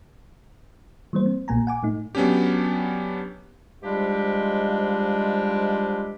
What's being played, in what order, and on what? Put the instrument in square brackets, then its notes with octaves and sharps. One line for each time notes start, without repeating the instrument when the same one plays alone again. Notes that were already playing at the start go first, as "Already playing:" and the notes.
[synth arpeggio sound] E3 G3 A#3 C5
C4
A#1 A#2 A#3 G#5 A#5
F#5 G#5 D6
A2 A3 D#4
[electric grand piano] F#3 B3 C#4 D4 G4
[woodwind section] G#2 F3 G3 G#3 D4 G4